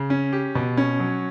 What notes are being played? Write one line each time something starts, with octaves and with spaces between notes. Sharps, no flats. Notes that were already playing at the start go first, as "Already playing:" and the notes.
Already playing: C#3
C#4
G4
B2
C#4
F#3